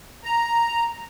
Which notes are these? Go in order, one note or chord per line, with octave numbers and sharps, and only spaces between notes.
A#5